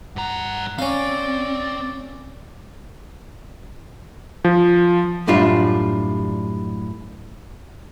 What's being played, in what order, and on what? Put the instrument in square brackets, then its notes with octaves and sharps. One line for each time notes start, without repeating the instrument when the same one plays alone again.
[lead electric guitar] G2 A#5 [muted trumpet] F#5
[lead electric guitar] C4 [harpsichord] C#4 F5 [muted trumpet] D5
[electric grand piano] F3
[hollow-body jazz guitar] F#2 A2 G3 D4 F4